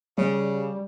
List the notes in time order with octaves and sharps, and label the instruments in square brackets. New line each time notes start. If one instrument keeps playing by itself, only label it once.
[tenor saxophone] C#3 [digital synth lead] G3